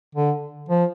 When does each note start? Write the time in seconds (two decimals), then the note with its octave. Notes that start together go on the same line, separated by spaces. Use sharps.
0.15 D3
0.69 F3